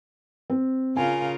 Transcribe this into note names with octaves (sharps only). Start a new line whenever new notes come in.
C4
C#3 F4 A#4 G#5